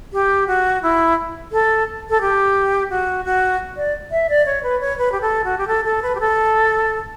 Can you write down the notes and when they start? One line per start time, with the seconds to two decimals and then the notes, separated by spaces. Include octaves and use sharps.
0.13 G4
0.47 F#4
0.82 E4
1.52 A4
2.09 A4
2.21 G4
2.90 F#4
3.25 F#4
3.77 D5
4.11 E5
4.29 D5
4.46 C#5
4.63 B4
4.81 C#5
4.98 B4
5.12 G4
5.21 A4
5.44 F#4
5.58 G4
5.68 A4
5.84 A4
6.02 B4
6.15 G4
6.20 A4